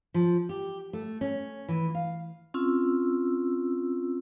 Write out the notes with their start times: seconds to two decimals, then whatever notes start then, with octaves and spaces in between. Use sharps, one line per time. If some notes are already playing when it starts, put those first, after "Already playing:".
0.14 F3
0.49 G4
0.93 A3
1.21 C#4
1.68 E3
1.95 F5
2.54 C4 C#4 F4 E6